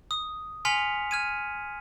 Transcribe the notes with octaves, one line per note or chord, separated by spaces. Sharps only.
D#6
G#5 C6 F6 B6 C#7 F7
F6 G#6 D#7